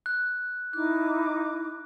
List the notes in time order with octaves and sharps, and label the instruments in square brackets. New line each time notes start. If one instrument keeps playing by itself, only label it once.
[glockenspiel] F#6
[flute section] D#4 E4 D6 [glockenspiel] F#6